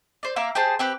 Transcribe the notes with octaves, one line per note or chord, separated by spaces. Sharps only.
C5 D5
A#3 E5 F5 D6
G4 G#4 C5 A5
C4 G4 B4